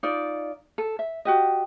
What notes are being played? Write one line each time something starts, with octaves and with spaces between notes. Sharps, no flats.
D#4 F4 D5
A4
E5
F#4 G4 D#5